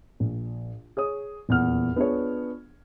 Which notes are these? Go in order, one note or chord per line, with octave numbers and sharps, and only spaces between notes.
A#1
G#4 C#5 D#6
D#1 E2 F#5 F6
B3 D4 F4 G#4 C#5